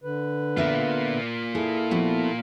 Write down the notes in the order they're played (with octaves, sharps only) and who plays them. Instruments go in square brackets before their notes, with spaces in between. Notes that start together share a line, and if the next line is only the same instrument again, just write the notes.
[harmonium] D3 B4
[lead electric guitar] A#3 F4 [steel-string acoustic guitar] B3 E5 F5
[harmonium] E4 A4 [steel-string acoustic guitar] G#4
[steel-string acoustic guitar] F3 B3 F#4